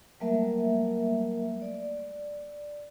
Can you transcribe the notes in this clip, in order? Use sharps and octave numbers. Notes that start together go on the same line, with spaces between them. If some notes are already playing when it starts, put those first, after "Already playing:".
F#3 G3 A3 A#3 A#4 E5
D5